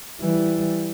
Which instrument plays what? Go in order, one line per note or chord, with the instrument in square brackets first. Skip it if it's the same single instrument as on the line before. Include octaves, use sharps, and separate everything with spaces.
[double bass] E3 G3